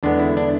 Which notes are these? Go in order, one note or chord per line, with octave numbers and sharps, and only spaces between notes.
E2 D3 G#3 B3 D4
E4
D4